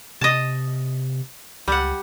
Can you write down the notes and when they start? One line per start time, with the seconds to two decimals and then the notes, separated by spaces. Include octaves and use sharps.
0.21 C3 D#5 A5
1.68 C#2 G3 F#5